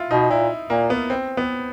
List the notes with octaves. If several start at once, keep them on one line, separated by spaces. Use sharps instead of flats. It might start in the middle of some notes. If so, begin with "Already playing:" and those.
Already playing: E4 F4
B2 D#4
A#2 E4
A#2 A#3
B3
C4
B3